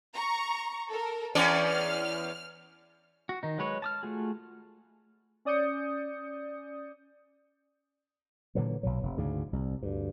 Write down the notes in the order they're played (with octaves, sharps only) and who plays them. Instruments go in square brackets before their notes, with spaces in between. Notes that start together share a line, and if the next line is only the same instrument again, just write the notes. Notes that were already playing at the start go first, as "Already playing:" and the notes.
[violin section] A#5 C#6
A4 A#4
[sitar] E2 C#4 D5 [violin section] G#5
[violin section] F6
[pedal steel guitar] F#4
D#3 D#4
F#3 G#3 B4 C#5
A5 D#6 F6
A3 F4 F#4 G#4
[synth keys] C#4 D5 D#6 G6 C#7
[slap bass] A#2 D3 E3 F#3
B1 B2 F#3
F1
D2 G#2 C#3
C2
D2 G2